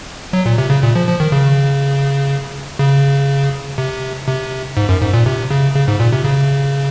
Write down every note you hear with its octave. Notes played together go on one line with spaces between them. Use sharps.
F#3
A#2
C3
C#3
A#2
F3
F3
D#3
C#3
C#3
C3
C3
G#2
F#2
G#2
A#2
C3
C#3
C#3
G#2
A#2
C3
C#3